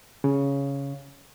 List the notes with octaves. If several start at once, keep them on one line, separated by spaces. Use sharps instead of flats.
C#3